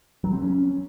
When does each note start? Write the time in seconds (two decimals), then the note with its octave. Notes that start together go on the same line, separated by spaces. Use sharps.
0.24 F#3
0.33 C4
0.42 C#4